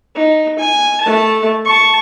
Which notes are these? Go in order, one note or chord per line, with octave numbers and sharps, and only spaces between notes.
D#4
G#5
A3 A5
A5 C#6